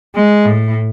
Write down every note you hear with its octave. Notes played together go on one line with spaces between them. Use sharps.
G#3
A2